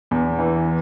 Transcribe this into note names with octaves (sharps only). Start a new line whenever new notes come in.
E2
E3